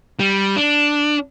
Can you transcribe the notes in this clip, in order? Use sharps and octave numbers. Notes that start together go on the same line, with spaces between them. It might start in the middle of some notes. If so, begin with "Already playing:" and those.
G3
D4